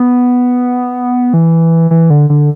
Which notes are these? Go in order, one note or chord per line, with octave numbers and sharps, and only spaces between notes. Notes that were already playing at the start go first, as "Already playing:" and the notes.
Already playing: B3
E3
E3
D3
D3